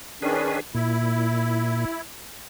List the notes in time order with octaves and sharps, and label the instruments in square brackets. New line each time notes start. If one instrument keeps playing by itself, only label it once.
[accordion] D#3 C#4 D4 [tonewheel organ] G#4 B4
[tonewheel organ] A#2 [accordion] E4